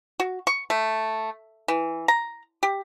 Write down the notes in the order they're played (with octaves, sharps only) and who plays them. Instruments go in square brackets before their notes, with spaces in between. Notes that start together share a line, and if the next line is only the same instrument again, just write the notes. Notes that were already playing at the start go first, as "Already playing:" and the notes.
[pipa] F#4
C#6
A3
E3
A#5
G4